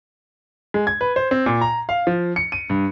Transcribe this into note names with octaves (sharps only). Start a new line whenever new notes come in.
G#3
G#6
B4
C5
C4
A#2
A#5
F5
F3
C#7
D#7
G2